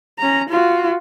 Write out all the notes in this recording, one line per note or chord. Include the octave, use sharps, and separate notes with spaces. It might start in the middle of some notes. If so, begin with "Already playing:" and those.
C#4 A#5
F4 F#4